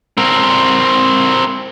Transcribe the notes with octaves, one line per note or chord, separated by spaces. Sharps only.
C4 A#4